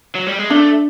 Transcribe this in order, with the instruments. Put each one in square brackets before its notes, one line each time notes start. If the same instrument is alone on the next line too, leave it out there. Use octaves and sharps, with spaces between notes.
[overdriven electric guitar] F#3
G3
G#3
[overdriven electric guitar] A3 [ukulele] D4